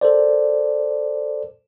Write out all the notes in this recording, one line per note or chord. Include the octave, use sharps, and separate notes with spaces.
A4 A#4 C5 D5